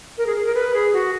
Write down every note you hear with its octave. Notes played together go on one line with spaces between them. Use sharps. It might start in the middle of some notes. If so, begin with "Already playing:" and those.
A#4
G#4
G#4
A#4
B4
G#4
F#4